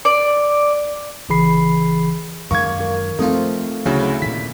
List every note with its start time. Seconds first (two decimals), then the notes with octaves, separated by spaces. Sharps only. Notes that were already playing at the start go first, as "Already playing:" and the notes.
0.05 D5
1.29 G1 C#3 E3 G#4 B5 C7
2.51 F#2 D#3 G#3 A#3 C#6 G#6
2.80 A#4
3.19 F3 A3 C4 D#4 F4 A4
3.86 D2 C#3 F#3 E4 F#4
4.22 A#2 D#3 B6